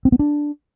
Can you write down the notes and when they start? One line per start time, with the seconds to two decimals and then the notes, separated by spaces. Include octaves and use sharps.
0.05 C4
0.12 B3
0.19 D4